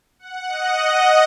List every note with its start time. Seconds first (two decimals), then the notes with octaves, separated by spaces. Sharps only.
0.19 F#5
0.48 D#5